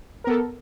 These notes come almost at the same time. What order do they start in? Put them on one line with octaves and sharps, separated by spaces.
A#4 B3 A4